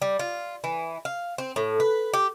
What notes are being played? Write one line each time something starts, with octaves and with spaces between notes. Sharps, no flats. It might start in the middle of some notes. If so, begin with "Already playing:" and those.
G3
F4
E3
F5
C4
A2
B4
G4